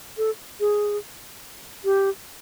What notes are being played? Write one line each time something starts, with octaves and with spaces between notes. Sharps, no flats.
A4
G#4
G4